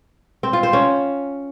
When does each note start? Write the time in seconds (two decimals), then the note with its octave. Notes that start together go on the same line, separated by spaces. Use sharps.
0.43 C4
0.53 F4
0.63 C5
0.73 C#4